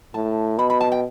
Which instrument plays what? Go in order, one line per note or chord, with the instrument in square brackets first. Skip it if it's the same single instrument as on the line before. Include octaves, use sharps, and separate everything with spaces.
[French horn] A2 [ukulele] A5
[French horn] B2 [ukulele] B5
[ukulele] B5
A5
G5